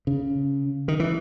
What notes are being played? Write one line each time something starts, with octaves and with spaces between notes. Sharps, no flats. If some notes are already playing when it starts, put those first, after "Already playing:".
C#3
D#3
E3